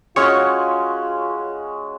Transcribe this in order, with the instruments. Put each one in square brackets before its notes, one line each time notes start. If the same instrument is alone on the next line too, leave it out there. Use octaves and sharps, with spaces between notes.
[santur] G#3 C#4 F#4 [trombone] F4 [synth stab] C#5